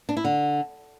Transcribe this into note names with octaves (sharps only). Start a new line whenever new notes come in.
D4
E4
D3